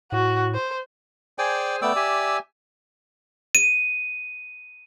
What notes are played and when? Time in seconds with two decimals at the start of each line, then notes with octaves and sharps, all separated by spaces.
0.12 A2 F#4
0.54 C5
1.39 G#4 C5 D5 G5 G#5
1.82 A3 B3 D5 G5 E6
1.96 G4 E5 G#5
3.55 D#7